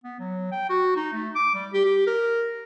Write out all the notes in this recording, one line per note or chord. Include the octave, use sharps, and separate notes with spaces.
B3
F#3
G5
F#4
D#4
A3
D6
G3
G4
G4
A#4